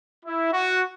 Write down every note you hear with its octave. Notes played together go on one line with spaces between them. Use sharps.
E4
F#4